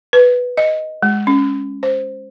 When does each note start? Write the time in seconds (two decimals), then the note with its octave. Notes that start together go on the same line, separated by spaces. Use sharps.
0.13 B4
0.57 D#5
1.03 G#3
1.27 C#4
1.83 C5